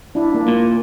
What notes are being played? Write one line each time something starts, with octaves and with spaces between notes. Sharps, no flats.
D4 E4
A#3 D4
A#2